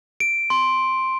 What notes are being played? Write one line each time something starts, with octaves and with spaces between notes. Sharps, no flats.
D7
C6